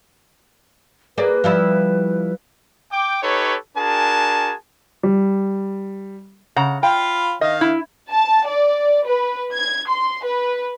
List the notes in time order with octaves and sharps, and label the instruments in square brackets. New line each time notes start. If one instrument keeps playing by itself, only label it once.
[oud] A#3 G#4 D5 [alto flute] B4
[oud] F3 G3 E4
[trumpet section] G5 D6
D#4 G4 A4 B4 C#5
D4 F#4 G#4 A#4 G#5 A5
[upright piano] G3
[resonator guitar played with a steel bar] C#3 F#5 A#5
[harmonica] F4 F5 B5 [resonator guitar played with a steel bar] G5
[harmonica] D#3 F5 [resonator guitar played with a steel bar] D#5
[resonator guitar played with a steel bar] E4
[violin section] A5
D5
B4
G#6
C6
B4